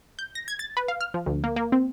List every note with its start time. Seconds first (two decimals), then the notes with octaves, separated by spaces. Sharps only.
0.19 G6
0.35 A#6
0.48 G#6
0.59 A6
0.77 B4
0.88 F5
1.01 F6
1.14 F3
1.26 D2
1.44 A#3
1.56 A#3
1.72 C4